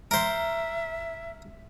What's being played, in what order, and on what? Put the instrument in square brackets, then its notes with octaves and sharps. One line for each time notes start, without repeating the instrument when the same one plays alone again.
[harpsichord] A#4 C5 [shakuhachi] E5